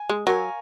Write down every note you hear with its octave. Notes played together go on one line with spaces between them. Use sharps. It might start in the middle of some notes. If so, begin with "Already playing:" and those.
Already playing: G#5
G#3
F#3 A#4 C#5 F5 G#5